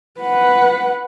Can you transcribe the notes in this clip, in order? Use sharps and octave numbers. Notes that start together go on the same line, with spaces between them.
B4 F#5